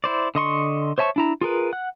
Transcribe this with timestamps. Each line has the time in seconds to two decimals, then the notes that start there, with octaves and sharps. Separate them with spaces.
0.04 E4 C5 D5
0.35 D3 D#5 C6 C#6
0.98 C5 C#5 E5 A5 C#6
1.16 D4 E4 A#5
1.41 F4 G#4 A#4 B4
1.73 F#5 F#6